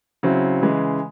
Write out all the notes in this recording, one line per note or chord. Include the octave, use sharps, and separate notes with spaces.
C#3 F#3 C4 E4
C#3 E3 G#3